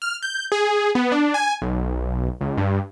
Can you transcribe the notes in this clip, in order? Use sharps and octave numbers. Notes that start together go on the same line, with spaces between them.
F6
G6
G#4
B3
D4
G#5
B1
C#2
G2